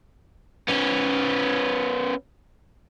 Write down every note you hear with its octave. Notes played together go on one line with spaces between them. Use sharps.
B3 C#4